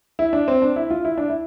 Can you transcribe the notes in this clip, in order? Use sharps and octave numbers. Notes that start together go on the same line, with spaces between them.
E4
D4
C4
D4
E4
F4
E4
D4
E4